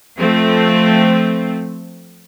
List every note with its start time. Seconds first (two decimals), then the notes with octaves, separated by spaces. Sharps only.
0.19 F3 A3 C4